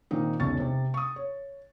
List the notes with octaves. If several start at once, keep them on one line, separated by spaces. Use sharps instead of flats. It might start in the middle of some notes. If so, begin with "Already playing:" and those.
A#2 D#3 A#3 C4 D#4
E1 B1 C#3 C#6 A6
C3
C#6 D#6
C#5